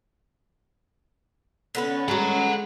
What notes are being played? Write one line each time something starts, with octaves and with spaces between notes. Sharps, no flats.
D3 B3 C#4 B4
G#3 F#4 F#5 A#5